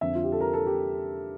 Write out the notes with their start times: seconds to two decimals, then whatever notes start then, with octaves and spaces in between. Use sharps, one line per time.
0.01 F2 D3 E5
0.15 F4
0.24 G4
0.32 A4
0.41 A#4
0.53 A4
0.66 G4